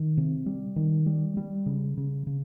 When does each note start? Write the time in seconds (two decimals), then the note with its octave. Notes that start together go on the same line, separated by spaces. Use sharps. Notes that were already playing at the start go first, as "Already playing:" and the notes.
Already playing: D#3
0.17 C3
0.46 G3
0.76 D#3
1.06 G3
1.37 G3
1.66 C#3
1.97 C#3
2.27 C#3